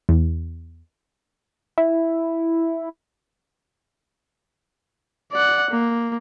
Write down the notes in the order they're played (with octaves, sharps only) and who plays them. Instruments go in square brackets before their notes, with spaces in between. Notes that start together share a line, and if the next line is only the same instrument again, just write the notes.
[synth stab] E2
[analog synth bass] E4
[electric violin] D5 F#5
A#3